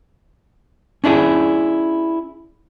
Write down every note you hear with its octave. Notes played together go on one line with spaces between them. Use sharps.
C#4 D4 E4 G#4